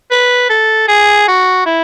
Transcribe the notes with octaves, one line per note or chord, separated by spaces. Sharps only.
B4
A4
G#4
F#4
E4